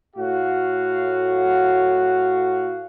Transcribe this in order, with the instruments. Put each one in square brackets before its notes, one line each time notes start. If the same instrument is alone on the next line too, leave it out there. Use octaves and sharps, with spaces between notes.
[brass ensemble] A2 F#4 F5